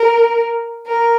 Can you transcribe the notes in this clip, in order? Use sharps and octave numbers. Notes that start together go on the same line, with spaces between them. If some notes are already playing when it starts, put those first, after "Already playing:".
Already playing: A#4
A#4